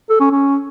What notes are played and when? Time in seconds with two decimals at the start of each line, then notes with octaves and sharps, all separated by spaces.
0.10 A4
0.20 C#4
0.31 C#4